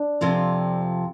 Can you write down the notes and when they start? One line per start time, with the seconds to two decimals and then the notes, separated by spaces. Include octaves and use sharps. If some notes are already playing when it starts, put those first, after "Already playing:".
Already playing: D4
0.21 F2 C3 F3 C4